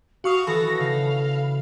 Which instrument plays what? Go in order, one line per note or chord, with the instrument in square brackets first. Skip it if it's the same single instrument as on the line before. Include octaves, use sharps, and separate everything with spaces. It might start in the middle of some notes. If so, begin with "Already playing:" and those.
[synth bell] F#4 C#6 D#6 [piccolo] F5
[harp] E3 F#4 [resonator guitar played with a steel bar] A4 [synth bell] B5 [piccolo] A#6
[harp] C#3 [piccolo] F5